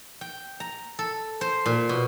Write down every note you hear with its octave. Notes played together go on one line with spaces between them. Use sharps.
G5
A#5
A4
C5
A#2
B2